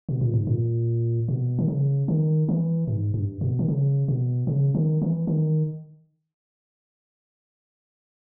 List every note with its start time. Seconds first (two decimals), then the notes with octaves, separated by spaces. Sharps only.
0.09 B2
0.21 A#2
0.34 G#2
0.47 A#2
1.28 B2
1.59 D#3
1.68 C#3
2.08 D#3
2.49 E3
2.87 G#2
3.14 G2
3.41 B2
3.59 D#3
3.68 C#3
4.08 B2
4.47 C#3
4.75 D#3
5.02 E3
5.27 D#3